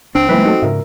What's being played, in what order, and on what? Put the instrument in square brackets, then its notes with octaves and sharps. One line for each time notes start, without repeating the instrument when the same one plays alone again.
[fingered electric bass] C#2 D4 [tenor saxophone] C4
[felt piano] C#2 E3 B4 [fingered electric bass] F#3 A3 A#3
[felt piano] D#4 F#4 A4
[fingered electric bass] G#2 C#3 [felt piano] A#4 E5